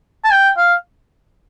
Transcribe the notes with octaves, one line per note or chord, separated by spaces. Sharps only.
A5
G5
F5